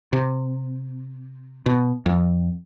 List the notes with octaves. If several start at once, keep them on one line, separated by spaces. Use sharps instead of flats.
C3
B2
F2